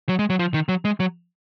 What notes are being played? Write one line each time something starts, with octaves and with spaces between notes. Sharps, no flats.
F#3
G#3
F#3
F3
D#3
F#3
G#3
F#3